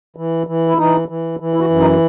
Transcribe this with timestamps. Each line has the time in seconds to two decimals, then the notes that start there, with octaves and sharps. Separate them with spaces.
0.16 E3
0.47 E3
0.68 E4
0.77 E3 D#4
1.08 E3
1.40 E3
1.54 E4
1.60 F#4
1.70 F#2
1.80 D#4